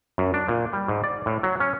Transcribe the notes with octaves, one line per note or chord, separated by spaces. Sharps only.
F#2
D4
A#2
G3
G#2
D5
A2
F#3
C#4